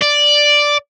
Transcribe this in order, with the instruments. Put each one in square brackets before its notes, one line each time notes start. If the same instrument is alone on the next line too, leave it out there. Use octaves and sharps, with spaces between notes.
[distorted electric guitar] D5